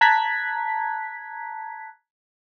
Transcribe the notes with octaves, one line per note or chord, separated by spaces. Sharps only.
A5 A#5 F#6 G#6 B6